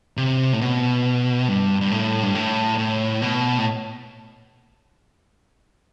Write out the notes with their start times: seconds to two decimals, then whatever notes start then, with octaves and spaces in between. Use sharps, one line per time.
0.17 C3
0.53 A2
0.61 B2
1.49 G2
1.81 G2
1.91 A2
2.23 G2
2.35 A2
2.78 A2
3.22 B2
3.58 A2